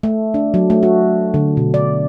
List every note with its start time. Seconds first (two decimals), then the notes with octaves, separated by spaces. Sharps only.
0.03 A3
0.34 D4
0.54 F#3
0.70 A3
0.83 F#4
1.34 D3
1.57 B2
1.74 D5